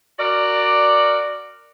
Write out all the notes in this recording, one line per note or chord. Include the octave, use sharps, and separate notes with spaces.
F#4 A#4 D5